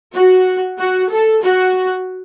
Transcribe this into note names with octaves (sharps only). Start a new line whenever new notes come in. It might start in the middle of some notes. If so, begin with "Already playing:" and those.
F#4
F#4
A4
F#4